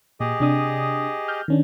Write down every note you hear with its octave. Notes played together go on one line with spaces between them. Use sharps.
A#2 G4 G#4 D#5
C3 D4 D#6
F6 G6
D#3 C#4 D4